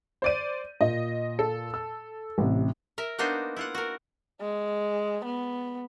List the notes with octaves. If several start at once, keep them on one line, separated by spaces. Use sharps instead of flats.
C5 D5 D#7
A#2 D#5
A4
E6
A1 C3
A#4 E5
A#3 B3 D4 D#4 F#4 C5
E4 F4 F#5
F#4 A#4
G#3
B3